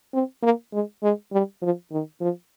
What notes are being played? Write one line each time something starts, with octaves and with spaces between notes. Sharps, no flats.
C4
A#3
G#3
G#3
G3
F3
D#3
F3